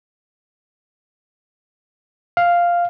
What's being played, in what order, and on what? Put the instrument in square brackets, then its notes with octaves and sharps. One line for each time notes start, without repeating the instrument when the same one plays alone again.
[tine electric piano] F5